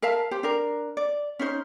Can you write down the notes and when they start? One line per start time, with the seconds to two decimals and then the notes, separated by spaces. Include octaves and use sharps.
0.02 A#4 E5 F5 A5
0.31 G4 C5
0.43 D4 A#4
0.97 D5
1.39 C#4 D#4 C5